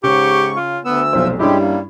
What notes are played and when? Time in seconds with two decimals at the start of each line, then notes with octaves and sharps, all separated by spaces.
0.04 G#2 C#3 G4 C#6
0.57 F4
0.85 D2 B3 E6
1.13 F1 B1 F3 C5
1.39 G2 G3 G#3 C#4 E4 G4
1.60 A#3